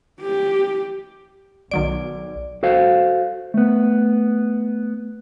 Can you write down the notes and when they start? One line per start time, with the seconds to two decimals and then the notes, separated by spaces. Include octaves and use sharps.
0.21 G4
1.71 B1 D#3 F#3 D5 D7
2.63 F#4 A4 C5 F5
3.54 A3 B3